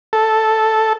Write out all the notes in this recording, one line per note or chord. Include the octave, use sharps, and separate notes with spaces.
A4